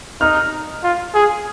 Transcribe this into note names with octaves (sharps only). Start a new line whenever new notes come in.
D#4 F6
F4
G#4